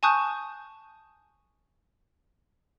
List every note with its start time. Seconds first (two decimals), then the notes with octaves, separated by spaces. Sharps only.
0.03 G#5 A5 C#6 D#6 F#6 G6